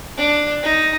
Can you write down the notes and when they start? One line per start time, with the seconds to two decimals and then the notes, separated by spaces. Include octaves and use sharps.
0.17 D4
0.63 D#4